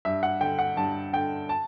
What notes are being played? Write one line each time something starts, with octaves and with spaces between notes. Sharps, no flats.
G2 E5
F#5
D3 G5
F#5
G2 A5
D3 G5
A5